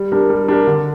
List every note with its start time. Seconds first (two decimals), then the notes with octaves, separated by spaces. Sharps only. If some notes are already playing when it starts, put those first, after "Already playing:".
Already playing: G3
0.12 D4 G4 A#4
0.30 G3
0.48 D4 G4 A#4
0.67 D3